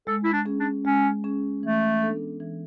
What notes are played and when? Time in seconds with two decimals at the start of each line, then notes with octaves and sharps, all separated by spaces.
0.07 G#3 A4
0.24 E4
0.33 D4
0.45 C#4 G#4
0.59 D4
0.85 G#3 C#4
1.24 C#4 G#4
1.63 E3 A3
2.02 B3 D4 A4
2.40 E3